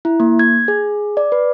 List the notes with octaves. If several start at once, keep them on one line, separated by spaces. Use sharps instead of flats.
E4
A#3
G#6
G#4
D5
B4